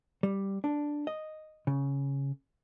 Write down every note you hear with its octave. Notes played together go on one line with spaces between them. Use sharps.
G3
D4
D#5
C#3